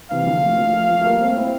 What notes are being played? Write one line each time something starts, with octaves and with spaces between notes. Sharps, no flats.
C3 E3 F5
G3
D3 F3
F3 A3
F3 A3
F3 A3
F3 A3
A3
G3 A#3
A3 C4
C4 E4